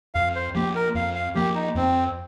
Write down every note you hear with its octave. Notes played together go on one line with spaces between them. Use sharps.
F2 F5
C5
F3 A#3 G4
A#4
F2 F5
F5
F3 A#3 G4
D#4
F2 C4